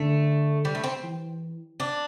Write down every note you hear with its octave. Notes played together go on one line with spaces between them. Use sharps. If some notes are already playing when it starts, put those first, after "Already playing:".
Already playing: D3 A3
G3
A3
C4
E3
D4